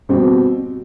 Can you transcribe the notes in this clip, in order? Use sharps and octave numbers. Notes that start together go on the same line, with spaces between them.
B2 G3 C4